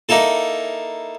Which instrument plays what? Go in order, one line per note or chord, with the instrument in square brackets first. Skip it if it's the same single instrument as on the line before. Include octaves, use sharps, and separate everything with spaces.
[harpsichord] A#3 D#4 E4 A4